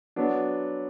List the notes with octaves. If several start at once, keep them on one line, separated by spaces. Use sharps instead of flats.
F#3 B3 D4